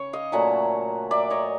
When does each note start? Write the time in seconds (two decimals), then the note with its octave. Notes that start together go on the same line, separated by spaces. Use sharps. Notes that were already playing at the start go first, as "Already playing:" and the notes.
Already playing: C#3 C#5
0.13 D#5 F5
0.32 A#2 F#3 A3 C#4 E5 F#5
1.11 D5 E5
1.30 C#5 D#5